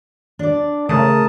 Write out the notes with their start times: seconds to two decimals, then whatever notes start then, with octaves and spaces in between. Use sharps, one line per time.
0.39 D4 D5
0.89 C#3 A3 A#4 A5 D#6